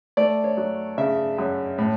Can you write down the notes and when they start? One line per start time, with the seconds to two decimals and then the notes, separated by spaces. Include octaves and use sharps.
0.17 A3 D5
0.44 C#5
0.57 F#3
0.98 C#3 E5
1.38 F#2
1.78 A2